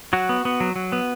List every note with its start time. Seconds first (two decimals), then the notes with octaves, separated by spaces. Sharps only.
0.13 F#3 F#4
0.29 B3
0.45 B3
0.60 F#3
0.76 F#3
0.92 B3